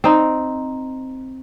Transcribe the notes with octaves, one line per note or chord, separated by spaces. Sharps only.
C4 D#4